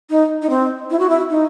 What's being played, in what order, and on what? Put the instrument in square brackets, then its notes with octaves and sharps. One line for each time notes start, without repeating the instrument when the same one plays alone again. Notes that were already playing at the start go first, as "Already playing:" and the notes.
[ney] D#4
D#4
C4
E4
F#4
E4
D#4